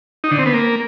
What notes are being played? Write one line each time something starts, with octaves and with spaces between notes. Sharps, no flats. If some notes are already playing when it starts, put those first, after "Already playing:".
D#4
D3
C4
B3
A#3